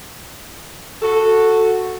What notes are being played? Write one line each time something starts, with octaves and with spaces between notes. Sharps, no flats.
F#4 A4